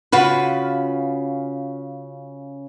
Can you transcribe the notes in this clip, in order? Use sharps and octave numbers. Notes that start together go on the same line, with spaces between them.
C#3 F4 F#4 B4